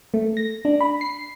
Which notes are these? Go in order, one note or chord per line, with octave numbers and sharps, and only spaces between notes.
A3
A#6
D4
B5
C7